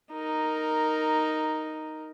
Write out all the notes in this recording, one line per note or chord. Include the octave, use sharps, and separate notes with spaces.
D#4 A#4